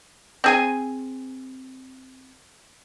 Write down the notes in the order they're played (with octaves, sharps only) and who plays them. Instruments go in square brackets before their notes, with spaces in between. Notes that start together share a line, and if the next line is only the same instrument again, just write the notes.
[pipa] C4 G#4 G#5